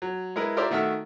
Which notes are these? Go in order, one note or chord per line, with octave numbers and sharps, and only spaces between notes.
F#3
G#3 E4 A#4 B4
F4 G4 A#4 C5 D5 E5
D#3 A3 F#4 E5 E6 F6